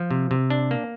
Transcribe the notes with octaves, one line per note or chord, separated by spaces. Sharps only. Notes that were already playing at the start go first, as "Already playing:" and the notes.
Already playing: F3
C3
C3
D4
A#3